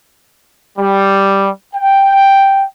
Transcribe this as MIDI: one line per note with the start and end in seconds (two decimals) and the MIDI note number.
0.78 1.48 55
1.75 2.65 79